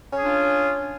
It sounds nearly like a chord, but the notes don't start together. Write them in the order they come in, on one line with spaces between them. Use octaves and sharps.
C#4 G#4 D4 F4